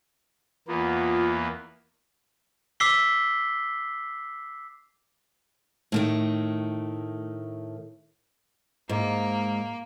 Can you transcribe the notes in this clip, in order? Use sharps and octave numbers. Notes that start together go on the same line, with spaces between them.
E2 A#3 B3 F4
D6 E6 B6 C7 G7
A2 D#3 A3
G#2 A#3